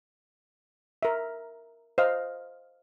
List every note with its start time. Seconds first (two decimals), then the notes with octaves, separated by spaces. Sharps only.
1.03 A#4 E5
1.98 C5 D#5 F5